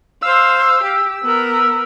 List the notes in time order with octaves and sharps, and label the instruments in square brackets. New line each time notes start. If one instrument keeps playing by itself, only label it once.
[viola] C5 F5 [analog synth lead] E6
[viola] G4
B3 A#4